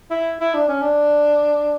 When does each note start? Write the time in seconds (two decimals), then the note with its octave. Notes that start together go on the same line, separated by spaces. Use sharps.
0.11 E4
0.40 E4
0.54 D4
0.68 C#4
0.81 D4